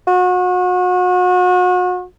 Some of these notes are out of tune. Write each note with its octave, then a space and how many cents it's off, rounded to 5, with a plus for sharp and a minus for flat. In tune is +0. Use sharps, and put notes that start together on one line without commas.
F#4 -35